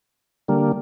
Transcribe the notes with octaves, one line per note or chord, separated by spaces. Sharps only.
D3 G3 A#3